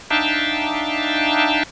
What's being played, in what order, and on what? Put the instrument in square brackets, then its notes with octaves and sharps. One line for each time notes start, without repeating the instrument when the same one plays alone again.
[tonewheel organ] D4 D#4 E5 F5 G5 A5